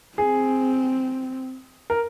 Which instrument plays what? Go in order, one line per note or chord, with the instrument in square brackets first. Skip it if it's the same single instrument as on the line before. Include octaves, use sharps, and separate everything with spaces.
[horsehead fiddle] C4 [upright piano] G#4
[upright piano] A#4